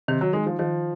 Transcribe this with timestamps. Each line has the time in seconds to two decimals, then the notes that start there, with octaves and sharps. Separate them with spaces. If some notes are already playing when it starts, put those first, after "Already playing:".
0.08 C3 D#3
0.21 F#3
0.33 G#3 D#4
0.46 F3
0.59 D#3 F3